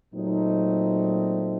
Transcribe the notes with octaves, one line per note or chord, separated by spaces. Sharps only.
A#2 F#3 A3 C4 D#4